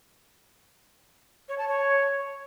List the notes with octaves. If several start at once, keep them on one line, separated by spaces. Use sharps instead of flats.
C#5
A5
C#5